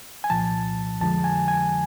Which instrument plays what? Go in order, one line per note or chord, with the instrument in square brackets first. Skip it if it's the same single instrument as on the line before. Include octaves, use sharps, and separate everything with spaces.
[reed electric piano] G#5
C2 A#2 F3 A5
F2 D3 F3 G#3 A5
G#5
G#5